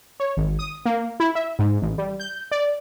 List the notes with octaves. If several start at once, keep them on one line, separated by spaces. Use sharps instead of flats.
C#5
G#1
D#6
A#3
E4
E5
G#2
A1
G3
G6
D5